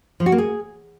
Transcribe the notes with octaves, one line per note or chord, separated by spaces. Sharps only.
F3
F#4
A#3
G#4